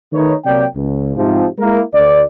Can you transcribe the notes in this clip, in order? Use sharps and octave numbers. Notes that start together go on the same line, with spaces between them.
D#3 A3 D#4 B4 C#5
C3 F#3 A#3 D5 G5
C#2
G#2 C3 F3
G#3 A#3 E4 A#4
D2 D5